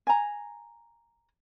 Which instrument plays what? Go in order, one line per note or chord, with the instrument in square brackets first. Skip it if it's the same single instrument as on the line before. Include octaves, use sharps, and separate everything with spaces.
[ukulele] G#5 A#5